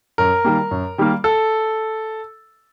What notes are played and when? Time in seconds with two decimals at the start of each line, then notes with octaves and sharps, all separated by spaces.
0.18 F#2 A#4
0.44 D#3 G3 A#3
0.71 F#2
0.98 D#3 G3 A#3
1.24 A4